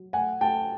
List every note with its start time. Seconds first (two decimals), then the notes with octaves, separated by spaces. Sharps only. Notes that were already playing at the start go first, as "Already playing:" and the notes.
Already playing: F#3
0.13 A3 F#5 G#5
0.41 A3 G5 A5